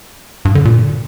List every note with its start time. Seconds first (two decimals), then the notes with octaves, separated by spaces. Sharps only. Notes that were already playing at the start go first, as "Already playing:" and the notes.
0.45 G2
0.55 D3
0.65 A#2